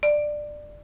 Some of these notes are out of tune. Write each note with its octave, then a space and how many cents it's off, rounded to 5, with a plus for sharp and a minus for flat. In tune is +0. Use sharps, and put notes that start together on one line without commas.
D5 +15